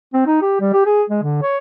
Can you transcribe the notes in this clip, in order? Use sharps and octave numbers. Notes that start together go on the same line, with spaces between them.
C4
D#4
G4
G3
G4
G#4
G#3
D3
C#5